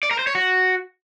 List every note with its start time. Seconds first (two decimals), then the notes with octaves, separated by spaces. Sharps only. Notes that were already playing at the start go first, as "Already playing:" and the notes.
0.03 D5
0.11 A#4
0.19 C5
0.27 C#5
0.35 F#4